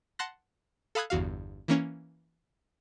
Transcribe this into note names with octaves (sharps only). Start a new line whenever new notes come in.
F#5 A5 C6 F#6 A#6
A4 F5 B5 D#6 F#6 G#6
G1 E2 F#4 F5
E3 A#3 C#4